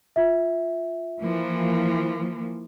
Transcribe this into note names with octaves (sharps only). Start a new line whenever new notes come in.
F4 E5
E3 F3 A#3